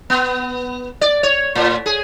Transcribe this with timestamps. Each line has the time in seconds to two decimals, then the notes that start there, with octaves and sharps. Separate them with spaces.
0.10 B3
1.01 D5
1.23 C#5
1.55 A2
1.86 G#4